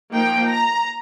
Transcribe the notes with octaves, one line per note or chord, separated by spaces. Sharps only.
F3 A#3 D#4 G5
A#5